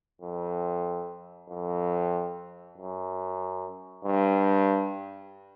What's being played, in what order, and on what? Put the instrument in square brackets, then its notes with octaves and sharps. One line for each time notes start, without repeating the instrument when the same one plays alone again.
[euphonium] F2
F2
F#2
G2